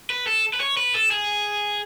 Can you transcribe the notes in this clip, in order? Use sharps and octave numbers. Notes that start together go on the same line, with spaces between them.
B4
A4
B4
C#5
B4
A4
G#4